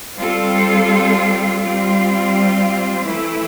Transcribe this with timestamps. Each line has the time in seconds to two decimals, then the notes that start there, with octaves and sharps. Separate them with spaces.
0.18 G3 C4 F4 A4
1.62 G3 C4 F4
3.05 E3 A3 E4